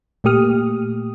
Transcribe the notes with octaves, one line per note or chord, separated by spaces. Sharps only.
A#2 A3 A#3 G4 D#6 F6